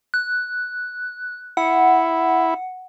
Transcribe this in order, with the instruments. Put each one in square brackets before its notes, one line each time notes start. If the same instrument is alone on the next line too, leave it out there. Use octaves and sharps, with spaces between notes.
[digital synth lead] F#6
[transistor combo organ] E4 [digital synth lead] F#5